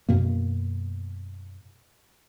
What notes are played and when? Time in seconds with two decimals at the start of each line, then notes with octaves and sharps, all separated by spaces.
0.09 F#2 B2 A#3